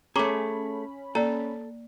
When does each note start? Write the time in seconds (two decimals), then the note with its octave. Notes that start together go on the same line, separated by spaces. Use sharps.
0.16 A3 C#4 G#4 A#5 B5 C#6 D6
1.15 A#3 A4 D5 A#5